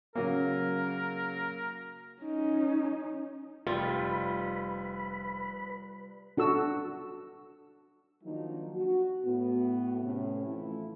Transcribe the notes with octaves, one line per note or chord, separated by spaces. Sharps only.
C#3 F#3 A#3 A#4
C#4 D#4
F1 G3 F4 B4 B5
D4 F#4 A4 E6
D#3 F3 F#3 A#3 D4 D#4
F#4
A2 B3 F#4
A2 C3 C#4
E3 F3 A3 E4